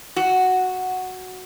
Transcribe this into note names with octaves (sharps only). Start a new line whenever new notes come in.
F#4